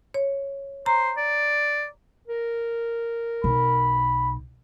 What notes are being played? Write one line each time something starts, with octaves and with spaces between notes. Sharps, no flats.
C#5
C5 A#5
D5
A#4
B1 B5